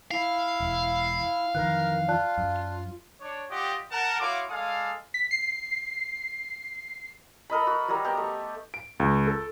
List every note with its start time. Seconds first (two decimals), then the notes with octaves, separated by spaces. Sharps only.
0.11 E4 F5
0.60 E1
1.55 F2 D#3 E3 A#4 F#6
2.08 F4 D5 A5 F#6
2.38 F#2
3.20 D4 C#5
3.50 F4 G4 D5 D#5 F#5 G5
3.91 A#4 F#5 A5
4.20 E4 F#4 C#5 F5 C6 D6
4.50 G#3 A4 D5 F5 G#5 D#6
5.14 B6
5.31 C7
7.50 A4 A#4 D#5 B5
7.67 F#4
7.88 F#3 G3 A#4
8.05 B3 G4 A#5
8.17 A3
8.74 D7
9.00 C#2
9.27 A4